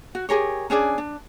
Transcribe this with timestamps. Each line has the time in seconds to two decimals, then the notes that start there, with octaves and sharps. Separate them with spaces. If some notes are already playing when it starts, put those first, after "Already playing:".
0.15 F#4
0.29 G4 G#4 A#4 C#5
0.70 C#4 D4 G#4 D5
0.98 D4